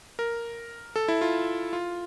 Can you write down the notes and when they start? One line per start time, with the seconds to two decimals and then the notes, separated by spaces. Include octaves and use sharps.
0.19 A#4
0.96 A4
1.08 E4
1.21 F4
1.73 F4